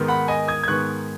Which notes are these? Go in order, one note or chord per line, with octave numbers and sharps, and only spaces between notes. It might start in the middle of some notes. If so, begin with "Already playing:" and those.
Already playing: G#2 D#3 B3
F#5 B5
D#5 G#5
D#6 G#6
G#6
G#2 D#3 B3 C#6 F#6